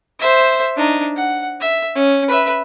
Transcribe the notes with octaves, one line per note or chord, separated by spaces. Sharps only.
C5 E5
D4 D#4
F#5
E5
C#4
B4 E5